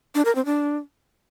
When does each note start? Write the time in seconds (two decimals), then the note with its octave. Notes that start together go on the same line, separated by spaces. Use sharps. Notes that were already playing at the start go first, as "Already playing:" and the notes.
0.15 D4
0.25 A#4
0.35 C4
0.45 D4